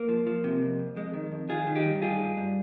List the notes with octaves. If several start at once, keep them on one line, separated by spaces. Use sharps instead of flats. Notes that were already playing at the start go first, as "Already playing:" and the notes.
Already playing: A#3
F3
F3
C3
F2
F2
F2 G#3
D#3
F2
D#3 F4 G#4
D#3
D#4 G4
G2
G2 F4 G#4
G2
G2